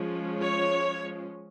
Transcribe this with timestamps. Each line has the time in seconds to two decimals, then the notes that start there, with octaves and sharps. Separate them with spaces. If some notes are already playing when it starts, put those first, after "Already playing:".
Already playing: F3 G#3 C#4
0.41 C#5